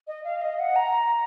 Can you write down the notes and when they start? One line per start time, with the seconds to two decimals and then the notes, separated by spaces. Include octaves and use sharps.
0.07 D#5
0.24 F5
0.42 D#5
0.59 F#5
0.76 A#5